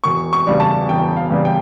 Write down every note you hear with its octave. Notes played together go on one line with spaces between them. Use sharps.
E1 C#6
C#6
E2 C#3 G3 D4
A5
E1 G5
F5
E2 C#3 G3 D4
G5